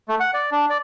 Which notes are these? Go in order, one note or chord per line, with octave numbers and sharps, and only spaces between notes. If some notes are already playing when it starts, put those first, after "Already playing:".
A3
F#5
D5
D4
D5